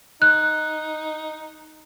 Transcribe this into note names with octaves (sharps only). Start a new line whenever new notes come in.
D#4 F#6